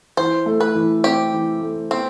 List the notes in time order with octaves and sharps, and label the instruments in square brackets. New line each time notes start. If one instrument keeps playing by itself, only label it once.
[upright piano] E3 [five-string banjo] C5
[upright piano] A3
[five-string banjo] B4
[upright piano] E3
[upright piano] C4 [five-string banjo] G4
[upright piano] E3
A3
[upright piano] B3 [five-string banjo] C4